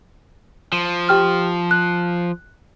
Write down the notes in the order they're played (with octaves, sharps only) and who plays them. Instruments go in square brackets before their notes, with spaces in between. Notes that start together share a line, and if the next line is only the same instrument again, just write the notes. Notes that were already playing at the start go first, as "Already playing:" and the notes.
[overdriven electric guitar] F3 [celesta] E7
[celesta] G4 G5 F6
F#6